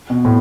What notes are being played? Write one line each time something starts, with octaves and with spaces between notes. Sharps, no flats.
B2
A2